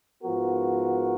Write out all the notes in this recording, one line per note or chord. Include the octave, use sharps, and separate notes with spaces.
G#2 F3 B3 F#4 A#4